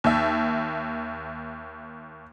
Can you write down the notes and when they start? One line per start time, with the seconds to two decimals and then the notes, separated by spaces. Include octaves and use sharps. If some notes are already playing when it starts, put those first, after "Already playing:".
0.04 D#2 E5